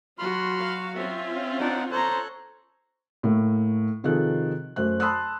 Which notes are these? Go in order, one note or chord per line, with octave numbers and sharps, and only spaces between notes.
F#3 F4 F#4 B5 C6 F6
F5
C4 C#4 F4 E5
D4 D#4 F#5
A4 C5 C#5 A#5 F#6
A2 A3 A#3
C3 D#3 F3 G#4 A4 F#6
F#2 A3 C5 F#6
A5 B5 C6 D#6 E6 F#6